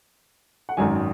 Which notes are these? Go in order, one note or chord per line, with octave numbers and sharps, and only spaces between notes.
F#5
G#1 F#2 D#3 G#5